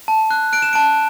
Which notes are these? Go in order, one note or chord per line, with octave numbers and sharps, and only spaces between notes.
A5
F#6
F#6 D7
E7
A5 D7